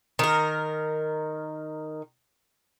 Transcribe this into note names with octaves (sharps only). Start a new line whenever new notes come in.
D#3 A#4